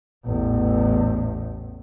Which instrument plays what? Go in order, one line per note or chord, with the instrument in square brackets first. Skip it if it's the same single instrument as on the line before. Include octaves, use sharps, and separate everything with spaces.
[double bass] A1 E2